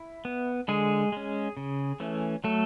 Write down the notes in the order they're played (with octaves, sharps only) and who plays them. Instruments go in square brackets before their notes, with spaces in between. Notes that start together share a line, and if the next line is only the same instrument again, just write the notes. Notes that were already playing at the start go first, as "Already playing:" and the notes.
Already playing: [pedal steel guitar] E4
B3
D3 G#3 G#4
G#3 C#4
C#3
E3 A3 C#4
F#3 A3 A4